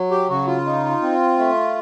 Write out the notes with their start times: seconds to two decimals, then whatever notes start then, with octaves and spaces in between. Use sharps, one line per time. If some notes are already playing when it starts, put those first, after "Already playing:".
Already playing: F#3
0.11 G4
0.29 C#3 F#4
0.47 F4
0.66 D#4
1.02 C4
1.39 A3